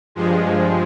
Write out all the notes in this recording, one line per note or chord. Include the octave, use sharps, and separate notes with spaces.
G2 F3 G#3